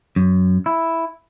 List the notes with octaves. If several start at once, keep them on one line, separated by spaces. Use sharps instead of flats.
F#2
E4